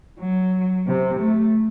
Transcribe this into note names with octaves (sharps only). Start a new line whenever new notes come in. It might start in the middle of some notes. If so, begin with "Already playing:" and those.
F#3
C3
A3